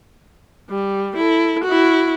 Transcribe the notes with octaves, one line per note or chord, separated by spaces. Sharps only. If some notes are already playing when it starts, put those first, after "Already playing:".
G3
E4 A4
E4 F#4